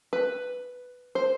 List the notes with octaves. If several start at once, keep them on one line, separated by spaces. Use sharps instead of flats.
B4
C5